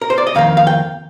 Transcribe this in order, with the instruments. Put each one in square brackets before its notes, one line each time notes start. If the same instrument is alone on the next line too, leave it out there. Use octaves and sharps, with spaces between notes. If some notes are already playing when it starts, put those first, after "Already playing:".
[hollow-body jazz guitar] A#4
C5
D5
D#5
F2 D#3 A#3 F5
F5
G5